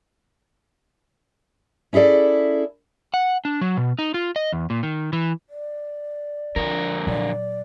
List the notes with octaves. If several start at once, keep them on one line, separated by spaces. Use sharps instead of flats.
C#4 E4 G#4 A4 D5
F#5
D4
F#3
B2
D#4
F4
D#5
E2
A#2
D#3
E3
D5
F2 D3 F4 A#4
A#2 F#3 D5